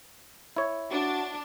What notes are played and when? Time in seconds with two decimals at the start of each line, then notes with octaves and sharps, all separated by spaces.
0.56 E4 C#5
0.91 D4 F#4